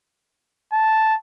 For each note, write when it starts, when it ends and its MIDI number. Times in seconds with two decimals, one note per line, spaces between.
0.73 1.16 81